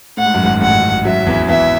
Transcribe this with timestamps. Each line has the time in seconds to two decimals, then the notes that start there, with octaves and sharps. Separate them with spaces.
0.17 A2 F#5
0.26 G#2
0.34 F#2
0.43 G#1 G#2
0.61 A1 A2 F#5
1.05 F#2 F#3 E5
1.27 E2 E3
1.48 E2 E3 E5